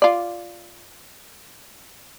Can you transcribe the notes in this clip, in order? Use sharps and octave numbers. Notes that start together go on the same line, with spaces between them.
F4 D5